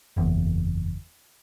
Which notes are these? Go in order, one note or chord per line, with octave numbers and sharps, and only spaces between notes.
F#1 E2